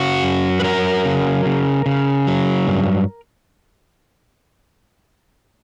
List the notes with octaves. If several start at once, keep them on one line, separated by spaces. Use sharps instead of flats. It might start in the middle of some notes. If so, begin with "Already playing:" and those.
Already playing: C#3 F#4
F#2
B4
F#3 A#4
C#3
C#3
C#3
F#3
G2